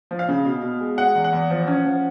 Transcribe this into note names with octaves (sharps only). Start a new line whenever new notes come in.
F3
F5
C#3
B2
B2
G#3
G#3 F#5
E2
F#5
E2
F3
C#4
F3